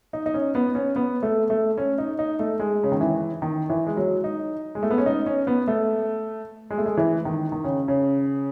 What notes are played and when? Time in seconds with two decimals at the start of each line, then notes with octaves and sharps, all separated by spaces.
0.13 D#4
0.26 D#4
0.34 C#4
0.55 B3
0.75 C#4
0.96 B3
1.23 A3
1.50 A3
1.78 C#4
1.98 D#4
2.19 D#4
2.39 A3
2.60 G#3
2.83 C#3
2.92 D#3
3.01 E3
3.42 D#3
3.69 E3
3.87 G#3
3.97 F#3
4.24 D#4
4.75 G#3
4.83 A3
4.91 B3
4.98 C#4
5.06 D#4
5.26 C#4
5.47 B3
5.68 A3
6.70 G#3
6.78 A3
6.86 G#3
6.97 E3
7.25 D#3
7.52 D#3
7.64 C#3
7.88 C#3